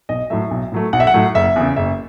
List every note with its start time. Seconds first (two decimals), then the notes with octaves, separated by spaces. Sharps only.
0.09 B1 D#5
0.30 A2 F#3 A3 E5
0.51 B1
0.72 A2 F#3 A3
0.93 B1 F#5
1.00 E5
1.07 F#5
1.14 A2 F#3 A3
1.35 F#1 E5
1.56 E2 C#3
1.76 F#1 E5